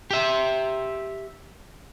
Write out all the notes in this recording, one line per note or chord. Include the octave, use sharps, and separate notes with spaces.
G4 E5